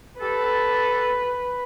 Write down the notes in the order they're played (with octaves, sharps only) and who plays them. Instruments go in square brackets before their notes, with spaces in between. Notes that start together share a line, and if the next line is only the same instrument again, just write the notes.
[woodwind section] G4 A4 [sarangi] B4